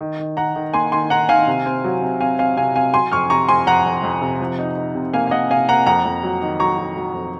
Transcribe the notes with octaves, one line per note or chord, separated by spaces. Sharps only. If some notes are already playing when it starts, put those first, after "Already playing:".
D#3
D#3
D#3 F#5 A#5
D#3
A#3 G#5 C6
D#3 G#5 C6
D#3 F#5 A#5
D#3 F5 G#5
C3
C4
F#3
C3
C4 F5 G#5
C4 F5 G#5
C3 F5 G#5
C4 F5 G#5
F#3 G#5 C6
F2 C#6 F6
C3 A#5 C#6
F2 G#5 C6
F2 F#5 A#5
F2
F2
C3
F3
D#4
D#4
C3
A#3 F5 G#5
F5
A#3 D#5 F#5
C3 F5 G#5
A#3 F#5 A#5
F2 F#5 A#5
F2
F#3
D#3
F#3 A#5 C#6
F#3
F#3
F2